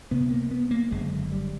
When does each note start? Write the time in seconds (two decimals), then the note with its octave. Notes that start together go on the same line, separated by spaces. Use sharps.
0.11 C#2 C3 B3
0.31 A#3
0.51 B3
0.71 A#3
0.91 F#1 F#2 D3 G#3
1.32 G3